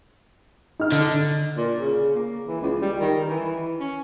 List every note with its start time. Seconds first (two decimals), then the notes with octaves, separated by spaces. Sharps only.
0.79 D#4 F6
0.92 D3
1.57 A#2
1.79 C#3
2.15 A#3
2.47 E3
2.61 C#2
2.82 G3
3.00 D#3
3.28 E3
3.80 C#4